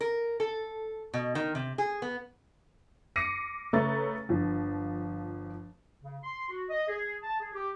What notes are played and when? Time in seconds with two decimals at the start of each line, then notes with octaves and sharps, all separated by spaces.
0.01 A#4
0.40 A4
1.14 B2
1.35 D#3
1.55 C3
1.78 G#4
2.02 B3
3.16 D6 A#6 C7 C#7 D#7
3.73 C#3 A3 B4 A#5 C#6 A6
4.29 G1 F3
6.01 C#3
6.22 C6
6.49 F#4
6.70 D#5
6.88 G#4
7.23 A5
7.40 G#4
7.54 G4